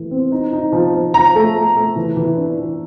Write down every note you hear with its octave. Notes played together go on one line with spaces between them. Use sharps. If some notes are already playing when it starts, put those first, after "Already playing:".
Already playing: E3 A3
C4
D#4
D#4
F3
F3
F3 A#5
A3
A3
A3
E3
E3
D4
E3